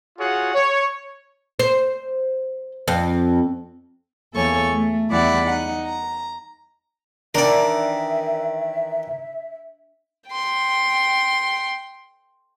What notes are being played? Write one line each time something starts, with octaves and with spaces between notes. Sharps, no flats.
F4 F#4 G#4 C#5 F#5
C#5
C5
F2
E2 A#3 A4 C#5 G#5 C#6
A3
E2 G3 E4 D5 F#5 B5
D#4 F#5
A#5
D#3 E3 D4 A#4 D5 E5
G5 C6